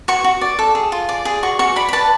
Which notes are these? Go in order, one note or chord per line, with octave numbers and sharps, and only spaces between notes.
F#4 C#6
F#4
D5
A4
G#4
F4
D5
G#4
F#4 C#6
F#4 C#6
D5 B5
B5
B4 A5